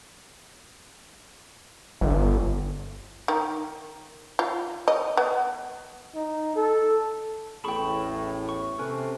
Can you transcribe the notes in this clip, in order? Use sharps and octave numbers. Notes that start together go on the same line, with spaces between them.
G1
D#3
F4
D#5
B3
D#4
A4
A1 E2 A2 G#4 G5 A5 B5 C#6
C#6
C3 C#4 A4 B4